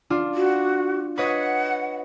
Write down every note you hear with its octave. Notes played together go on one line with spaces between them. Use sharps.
D4 F4
F#4
B4 C#5 D#5 F#5